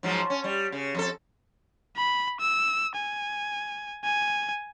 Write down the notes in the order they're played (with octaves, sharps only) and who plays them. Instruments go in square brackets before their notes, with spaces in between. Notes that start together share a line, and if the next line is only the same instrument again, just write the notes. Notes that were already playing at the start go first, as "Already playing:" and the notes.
[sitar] G#2 F3 F#3
C#4
G3
C#3
F2 A4
[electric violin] B5
E6
G#5
G#5